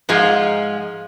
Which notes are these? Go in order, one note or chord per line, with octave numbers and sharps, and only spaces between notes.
G#2 F3 G#3 F4